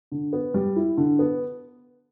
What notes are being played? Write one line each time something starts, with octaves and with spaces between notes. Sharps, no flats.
D3
B3
G3
E4
D3
B3